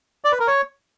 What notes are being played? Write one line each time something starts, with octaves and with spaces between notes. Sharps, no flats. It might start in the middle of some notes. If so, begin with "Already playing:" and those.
D5
B4
A#4
C#5